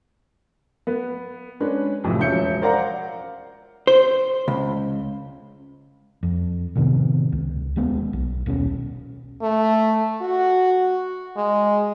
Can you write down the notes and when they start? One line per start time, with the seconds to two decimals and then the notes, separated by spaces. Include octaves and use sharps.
0.87 B3
1.60 G#3 C#4 D4 G#4 B4
2.04 B1 F2 A2 C3 F3
2.19 E1 F3 C#4 E5 G6 C#7
2.61 A#4 C5 D5 F5 F#5 A#5
3.87 C5
4.48 C#2
6.23 F2
6.75 A2 C3 D#3 B3
7.32 C#2
7.76 D#1 G#3 B3
8.13 B1
8.46 D#1 B2 C4 C#4
9.42 A3
10.22 F#4
11.37 G#3